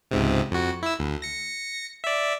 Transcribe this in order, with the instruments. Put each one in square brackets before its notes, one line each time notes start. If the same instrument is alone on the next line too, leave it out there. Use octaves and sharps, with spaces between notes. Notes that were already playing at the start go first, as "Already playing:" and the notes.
[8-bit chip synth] C#2 G#2 C3
F2 F#4
E4 E6
D2
A#6 C#7
D5 E5